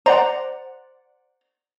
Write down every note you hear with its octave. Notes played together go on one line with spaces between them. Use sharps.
C5 D5 F#5 A#5